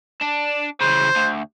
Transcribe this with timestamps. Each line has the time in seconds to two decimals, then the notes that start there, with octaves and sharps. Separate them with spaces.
0.21 D4
0.81 C#3 E3 C5
1.16 D2